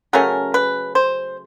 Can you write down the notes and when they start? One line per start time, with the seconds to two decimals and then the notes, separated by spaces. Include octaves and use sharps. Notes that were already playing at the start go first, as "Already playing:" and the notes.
0.13 C#3 F#3 A3 C#4 A#4
0.54 B4
0.95 C5